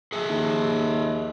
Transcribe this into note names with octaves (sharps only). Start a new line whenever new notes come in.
G#4 D#5 E5
D#2